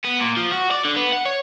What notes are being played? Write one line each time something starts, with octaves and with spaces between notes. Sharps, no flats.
B3
A#2
F3
F#4
D5
D3
B3
F#5
C#5